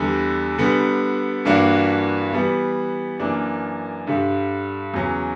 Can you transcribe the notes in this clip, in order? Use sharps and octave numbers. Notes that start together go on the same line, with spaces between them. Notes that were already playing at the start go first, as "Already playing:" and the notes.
Already playing: E2 D3 G3
D3 G3 B3
G2 E3 A#3 D4 F#4
E3 G3 B3
F#2 E3 A#3 D4
G2 D3 G3
E2 C#3 F#3 C#4